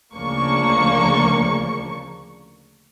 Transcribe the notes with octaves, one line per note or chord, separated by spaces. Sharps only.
D2 C#3 F3 A#3 D4 C#6